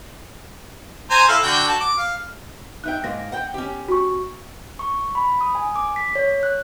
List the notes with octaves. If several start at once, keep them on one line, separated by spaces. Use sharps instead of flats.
C5 G#5 A#5
E4 A4 F5
D3 F#4 G5
F#4 A5
D6
F5
D#4 E5 G5 F#6
G#2 A#3 A#6
F#5 G5
C#4 G4
F#4 C#6
C#6
B5
D#6
G#5
D6
B6
C#5
F#6